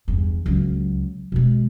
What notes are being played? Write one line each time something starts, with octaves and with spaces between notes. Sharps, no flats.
E2 G2
C#2 F#3
B2 G#3